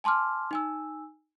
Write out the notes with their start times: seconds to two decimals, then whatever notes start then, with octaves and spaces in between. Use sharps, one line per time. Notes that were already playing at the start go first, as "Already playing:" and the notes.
0.04 G#5 A5 C6 D6 F6
0.51 D#4 G#5 E6